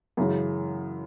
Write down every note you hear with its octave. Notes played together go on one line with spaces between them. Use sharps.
F#2 C#3 E3 G#3